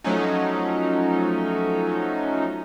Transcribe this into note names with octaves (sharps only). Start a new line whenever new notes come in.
F3 F#3 A3 C#4 D#4